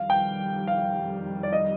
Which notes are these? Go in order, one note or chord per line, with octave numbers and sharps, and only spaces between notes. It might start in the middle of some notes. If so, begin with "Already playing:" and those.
Already playing: F2 D#3 G3 F5
G5
F5
D5
D#5